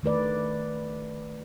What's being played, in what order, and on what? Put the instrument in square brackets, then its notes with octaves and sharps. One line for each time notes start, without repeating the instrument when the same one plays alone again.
[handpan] D#3 A3 B4 D5